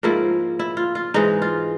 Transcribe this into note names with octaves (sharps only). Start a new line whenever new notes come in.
G#2 F3 A#3 E4
E4
F4
F4
G#2 E3 G#3 D#4
F4